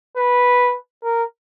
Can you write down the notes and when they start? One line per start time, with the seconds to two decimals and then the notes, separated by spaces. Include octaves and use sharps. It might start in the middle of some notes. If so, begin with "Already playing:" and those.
0.17 B4
1.03 A#4